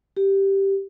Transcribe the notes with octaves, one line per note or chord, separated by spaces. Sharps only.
G4